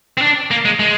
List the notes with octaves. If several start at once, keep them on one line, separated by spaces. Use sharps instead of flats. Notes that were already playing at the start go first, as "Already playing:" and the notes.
C4
D4
A#3
G#3
G#3